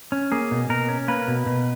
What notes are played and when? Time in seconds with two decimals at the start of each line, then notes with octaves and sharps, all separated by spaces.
0.12 C#4
0.32 A#3 G#4
0.51 B2
0.69 B2 A#4
0.89 C#4
1.08 A#3 B4
1.28 B2
1.46 B2